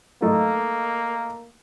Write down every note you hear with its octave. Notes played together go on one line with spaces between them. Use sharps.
A3 A#3 D#4